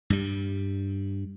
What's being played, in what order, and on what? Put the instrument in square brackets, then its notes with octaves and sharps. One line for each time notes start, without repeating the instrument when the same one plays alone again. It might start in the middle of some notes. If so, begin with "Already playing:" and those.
[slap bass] G2 G3